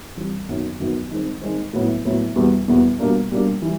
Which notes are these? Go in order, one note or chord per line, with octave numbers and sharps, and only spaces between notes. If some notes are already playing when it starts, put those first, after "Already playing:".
E3 G3 C4
F#2 D#3 F#3 B3
F#2 D#3 F#3 B3
D#3 G#3 C4
D#3 G#3 C4
A2 F#3 B3 E4
A2 F#3 B3 E4
E2 B2 G3 B3
E2 B2 G3 B3
B2 G3 A#3 D4
B2 G3 A#3 D4
E3 G3